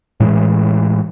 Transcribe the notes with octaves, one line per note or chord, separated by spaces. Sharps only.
A2 E3 G#3